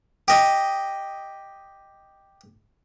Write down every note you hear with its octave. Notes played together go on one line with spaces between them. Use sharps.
G4 D#5